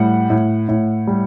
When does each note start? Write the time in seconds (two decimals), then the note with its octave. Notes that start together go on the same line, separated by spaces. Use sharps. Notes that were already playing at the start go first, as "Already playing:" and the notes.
Already playing: A2 G3 F#5
0.30 A2
0.69 A2
1.07 G3